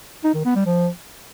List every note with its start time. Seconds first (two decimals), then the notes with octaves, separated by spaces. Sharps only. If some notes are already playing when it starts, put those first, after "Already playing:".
0.24 D#4
0.35 D#3
0.45 B3
0.56 G3
0.66 F3